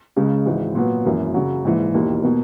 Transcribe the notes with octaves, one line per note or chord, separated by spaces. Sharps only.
C#2 C#3 G#3
G#1 G#2 E3 G#3
A#2 F#3 B3
G#1 F#2 E3 A#3
F#2 C#3 F#3
A#1 G#2 E3
E1 D#2 D#3 A#3 E4
B2 A#3